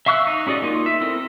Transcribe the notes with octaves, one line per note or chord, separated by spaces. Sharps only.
E5 F5 C#6 E6 F#6
D#4
C#4 F#4 G#4 D5 D#5
A#3 D#4 F4
E5
C4 E4 A4 A#4